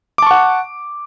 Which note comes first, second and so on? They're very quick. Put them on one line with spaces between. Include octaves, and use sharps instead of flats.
D6 A5 C#6 F#5